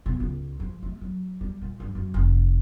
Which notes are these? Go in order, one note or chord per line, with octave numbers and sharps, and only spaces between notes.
B2
C#2
F3
A3
F#3
G3
A#2
G2
F#2
F1